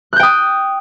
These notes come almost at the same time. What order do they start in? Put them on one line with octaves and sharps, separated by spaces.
F#6 G6 G5 D#6